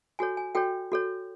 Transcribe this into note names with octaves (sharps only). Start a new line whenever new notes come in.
F#4 A4 C#5 G#5
G#5
F#4 A4 C#5 G5
F#4 A4 C#5